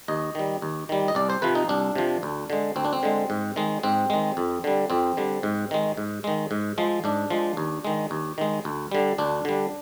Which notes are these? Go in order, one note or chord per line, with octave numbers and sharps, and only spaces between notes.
D#2 D#5
D#3 G3
D#2
D#3 G3
D#5
C2 D5
C5
C3 F3 B4
D#4
C2 D4
C3 F3
D2
D3 G#3
D2 C4
D4
C4
D3 G#3
G#2
D#3 G#3
G#2 C4
D#3 G#3
F2
D3 G3
F2 C4
D3 G3
G#2
D#3 G#3
G#2
D#3 G#3
G#2
F3 G#3
G#2 D4
F3 G#3
D#2
D#3 G#3
D#2
D#3 G#3
D2
D3 G3
D2 D4
D3 G3